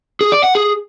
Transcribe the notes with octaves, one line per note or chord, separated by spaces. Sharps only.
G#4
D5
F#5
G#4